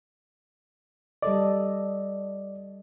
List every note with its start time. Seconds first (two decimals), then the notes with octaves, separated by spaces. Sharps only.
1.22 G3 A4 D5 D#5